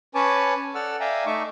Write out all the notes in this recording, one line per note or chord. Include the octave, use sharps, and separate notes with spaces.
C#4 B4 C#5 G#5 A5 D6
A4 D5 F#5 E6 F6
D5 E5 F5 G5 G#5 A#5
A3 D#4 E5 C#6 D6